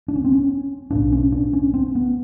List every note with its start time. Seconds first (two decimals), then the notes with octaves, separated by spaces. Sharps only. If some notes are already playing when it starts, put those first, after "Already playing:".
0.08 D4
0.16 C#4
0.24 C4
0.32 C#4
0.91 B1 A2 D4
1.12 C#4
1.32 D4
1.53 C#4
1.74 C4
1.95 B3